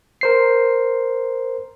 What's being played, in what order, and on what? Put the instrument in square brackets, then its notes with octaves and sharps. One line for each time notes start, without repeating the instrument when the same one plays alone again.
[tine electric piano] A#4 C5 C7